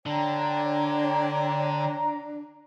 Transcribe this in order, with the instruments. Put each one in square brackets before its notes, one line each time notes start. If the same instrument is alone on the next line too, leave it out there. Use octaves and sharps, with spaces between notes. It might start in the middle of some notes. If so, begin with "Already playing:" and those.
[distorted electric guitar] D3 [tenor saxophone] D4 [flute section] C#5 G5 [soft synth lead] A#5